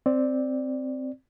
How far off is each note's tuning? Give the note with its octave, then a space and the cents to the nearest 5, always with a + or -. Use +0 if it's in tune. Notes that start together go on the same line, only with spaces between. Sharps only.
C4 +0 D5 +0